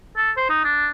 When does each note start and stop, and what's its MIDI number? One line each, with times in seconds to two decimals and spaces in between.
0.17 0.31 69
0.37 0.49 72
0.50 0.59 63
0.64 0.90 62